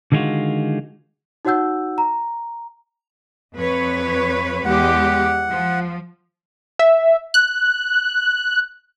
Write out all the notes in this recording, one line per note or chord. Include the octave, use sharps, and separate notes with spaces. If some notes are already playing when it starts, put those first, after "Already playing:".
D3 D#3 G#3 B3 F4 F#4
D#4 F#4 C#5 F#5 E6 G6
A#5
F2 B4 C#5
E2 G#3 G4 F#5
F3
E5
F#6